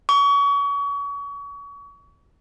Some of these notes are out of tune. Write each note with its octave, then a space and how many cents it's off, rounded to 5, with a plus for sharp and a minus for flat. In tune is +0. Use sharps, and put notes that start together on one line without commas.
C#6 +35